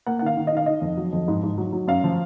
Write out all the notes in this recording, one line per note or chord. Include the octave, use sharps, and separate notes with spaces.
A#3 F#5
F#5
D#3 F5
D#3
D#5
D#3 F5
D#3 D#5
F2
F#3
F2
G#2
G#2
F#3
F#3
F#2 F5
F3